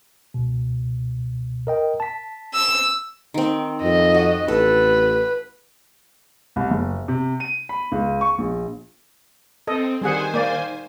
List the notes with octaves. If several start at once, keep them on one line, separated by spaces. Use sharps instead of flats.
C#2 B2
A#4 D#5 G5
A5 B6
E6
D#3 C4
F2 D#5
F#4
A1 A4 B4
C2
F#1
C3
D#7
B5
C#2
C#6
A#1
C4 A4 D#5
D#3 G3 G#4 C5 F#5 G#5
A#3 D5